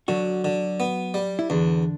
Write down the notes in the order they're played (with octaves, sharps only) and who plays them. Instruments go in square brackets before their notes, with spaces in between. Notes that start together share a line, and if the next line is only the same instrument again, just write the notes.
[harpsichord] D3 [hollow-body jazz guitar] F#3 F#4
[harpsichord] D3
B3
G3
[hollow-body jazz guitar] E4
[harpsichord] E2 [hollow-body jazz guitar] D3 D4